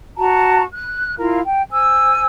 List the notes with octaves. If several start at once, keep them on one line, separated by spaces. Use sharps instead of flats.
F#4 A5 A#5
F#6
E4 F4 A#4 F5
G5
C5 G#5 E6